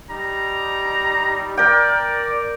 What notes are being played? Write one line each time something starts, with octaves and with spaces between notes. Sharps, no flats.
G3 D#4 A#5
A#4 D5 G5